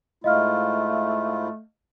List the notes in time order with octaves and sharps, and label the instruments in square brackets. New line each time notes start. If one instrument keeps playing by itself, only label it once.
[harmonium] G#2 E4 F4 [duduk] A3 [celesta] D#5 F5 F6